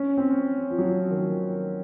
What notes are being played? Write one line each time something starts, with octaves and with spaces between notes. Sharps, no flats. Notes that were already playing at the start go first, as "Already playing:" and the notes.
Already playing: C#4
C4
F3
F#3
F3
D#3